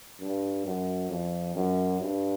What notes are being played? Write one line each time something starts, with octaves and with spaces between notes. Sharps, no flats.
G2
F#2
F2
F#2
G2